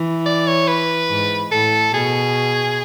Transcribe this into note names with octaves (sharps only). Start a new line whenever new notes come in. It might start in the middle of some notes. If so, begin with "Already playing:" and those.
Already playing: E3
D5
C#5
B4
G#2
A2 A4
B2 G#4